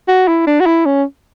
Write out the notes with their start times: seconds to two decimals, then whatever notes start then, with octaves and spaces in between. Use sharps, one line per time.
0.08 F#4
0.28 E4
0.47 D4
0.61 F#4
0.66 E4
0.86 C#4